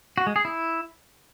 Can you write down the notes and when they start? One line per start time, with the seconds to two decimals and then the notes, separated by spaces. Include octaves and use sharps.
0.18 F#4
0.27 G#3
0.36 G#4
0.45 E4